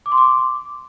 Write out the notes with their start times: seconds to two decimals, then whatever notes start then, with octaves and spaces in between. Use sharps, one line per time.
0.06 D6
0.12 C6
0.18 D6